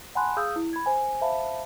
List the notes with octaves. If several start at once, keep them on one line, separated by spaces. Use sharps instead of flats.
F#5 G#5 A5 B5 C6 F#6
G#4 F5 D#6 E6 G6
E4
B5 G#6
C5 G#5
C5 E5 F5 A5 B5